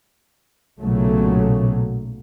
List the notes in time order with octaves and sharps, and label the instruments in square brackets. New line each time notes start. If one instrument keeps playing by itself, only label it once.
[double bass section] B1 A#2 C#3 F#3 A3